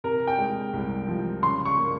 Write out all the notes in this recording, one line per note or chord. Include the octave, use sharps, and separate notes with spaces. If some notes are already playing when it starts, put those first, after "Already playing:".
C3 A#4
G5
G#3
C2
F3
C#3 C6
C#6
A#3